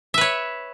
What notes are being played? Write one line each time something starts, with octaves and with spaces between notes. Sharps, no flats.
B4 C#5 E5